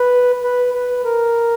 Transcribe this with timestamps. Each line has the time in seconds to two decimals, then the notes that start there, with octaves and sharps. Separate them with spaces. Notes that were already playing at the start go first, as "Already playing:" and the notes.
Already playing: B4
0.43 B4
0.74 B4
1.05 A#4